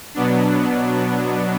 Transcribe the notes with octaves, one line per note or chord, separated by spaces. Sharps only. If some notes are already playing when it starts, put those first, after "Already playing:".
B2 F#3 B3 D4